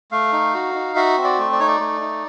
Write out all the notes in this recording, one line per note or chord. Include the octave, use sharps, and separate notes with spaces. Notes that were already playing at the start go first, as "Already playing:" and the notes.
A3 F5
D#4
F#4
D#4
F#4 E5
C4
D5
A3
D5
D#4 C#5
D5
A3
D#4